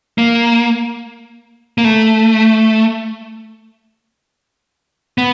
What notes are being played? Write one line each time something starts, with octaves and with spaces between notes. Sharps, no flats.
A#3
A#3
A3
B3